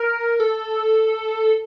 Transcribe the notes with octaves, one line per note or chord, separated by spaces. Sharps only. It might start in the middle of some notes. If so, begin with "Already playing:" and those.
Already playing: A#4
A4